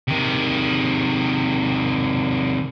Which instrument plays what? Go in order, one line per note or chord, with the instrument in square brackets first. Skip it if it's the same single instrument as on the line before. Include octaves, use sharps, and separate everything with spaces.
[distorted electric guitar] C3 D#3